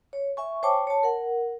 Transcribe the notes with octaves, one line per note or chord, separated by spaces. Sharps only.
C#5
E5 G#5 C#6
C5 C#5 G5 A5 C#6 D6
C#5 A5
A#4 F#5